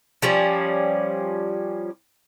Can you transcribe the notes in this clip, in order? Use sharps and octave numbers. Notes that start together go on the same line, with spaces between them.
F3 G3 C#4